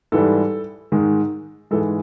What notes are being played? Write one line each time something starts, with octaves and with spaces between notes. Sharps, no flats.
G#2 E3 G3 A4
G#2 D#3 G#3
G#2 E3 G#3 A4